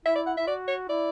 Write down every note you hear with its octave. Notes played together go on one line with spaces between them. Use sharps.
E4 E5
D5
F#5
E4 E5
F#4 D5
C#5
E4 D5